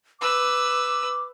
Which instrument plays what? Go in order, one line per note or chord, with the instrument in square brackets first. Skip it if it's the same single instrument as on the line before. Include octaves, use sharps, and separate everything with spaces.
[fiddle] B4 E6 [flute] D6